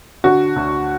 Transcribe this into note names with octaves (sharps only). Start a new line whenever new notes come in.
D3 F#4
D2